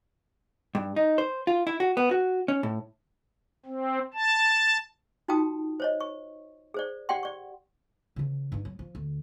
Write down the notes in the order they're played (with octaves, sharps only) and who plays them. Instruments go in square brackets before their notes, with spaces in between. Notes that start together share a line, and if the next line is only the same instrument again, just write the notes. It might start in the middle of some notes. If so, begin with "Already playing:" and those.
[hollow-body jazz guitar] G2
D#4
C5
F4
E4
F#4
B3
F#4
C#4
A2
[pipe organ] C4
A5
[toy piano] D#4 F4 F#4 G5 A5 D#6
C5 C#5 D#5
C#6
G#4 C5 D5
G4 D5 F#5 G5 C6
D5 C#6
[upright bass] C#3 E3
G2 D#4
F#3
F3
D2